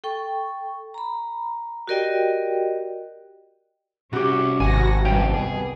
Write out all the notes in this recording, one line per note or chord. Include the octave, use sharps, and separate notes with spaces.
A4 G5 C#6
A#5 B5
F#4 G4 A#4 D5 D#5 G5
C2 C#4 F#4 G4
G#1 F#4 G#5 A#6
C2 G2 B2 G3 C#4 G5
G#4